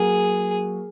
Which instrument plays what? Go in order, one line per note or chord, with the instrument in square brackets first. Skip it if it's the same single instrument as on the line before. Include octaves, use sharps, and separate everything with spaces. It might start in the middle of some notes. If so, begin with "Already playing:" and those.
Already playing: [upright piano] F#3 A#3 F#4 [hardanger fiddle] G#4